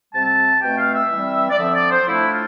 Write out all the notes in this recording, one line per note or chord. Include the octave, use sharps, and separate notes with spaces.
C3 G3 C4 A5
B2 A3 C4 G5
F5
E5
E3 G3 C4
D5
D3 F3 C4 E5
D5
C5
A2 F3 A3 D4 E4
F4